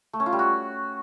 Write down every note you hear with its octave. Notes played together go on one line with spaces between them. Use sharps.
A3
C#4
F4
G3
F#4